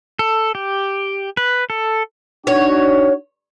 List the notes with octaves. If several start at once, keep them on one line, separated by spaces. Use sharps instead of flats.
A4
G4
B4
A4
D4 D#4 F#4 C#5